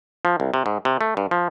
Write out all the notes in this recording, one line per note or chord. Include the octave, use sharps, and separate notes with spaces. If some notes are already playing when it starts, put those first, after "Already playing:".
F3
C2
C3
G#2
C3
A3
G2
F3